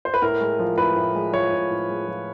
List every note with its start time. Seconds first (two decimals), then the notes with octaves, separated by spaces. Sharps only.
0.05 C5
0.14 B4
0.22 A2 A#4
0.41 G#3
0.59 F3
0.77 A2 B4
0.96 A2
1.15 G#3
1.33 F3 C#5
1.52 A2
1.70 A2
1.89 G#3
2.08 F3